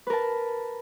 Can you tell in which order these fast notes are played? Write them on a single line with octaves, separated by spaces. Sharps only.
B4 A#4 A5